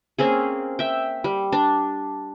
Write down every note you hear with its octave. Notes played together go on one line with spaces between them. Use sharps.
A#3 C4 C#4 G#4
E5 G5
G3
D4